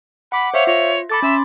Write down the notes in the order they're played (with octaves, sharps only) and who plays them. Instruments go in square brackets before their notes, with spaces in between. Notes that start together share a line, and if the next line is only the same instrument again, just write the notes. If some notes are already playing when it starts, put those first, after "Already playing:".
[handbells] F#5 D6 [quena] B5
[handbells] C5 E5 F5 [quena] C#5
[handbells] F4 [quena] C#5
[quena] A4 [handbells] B5 D6 A6
[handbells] C#4 C6 [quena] E5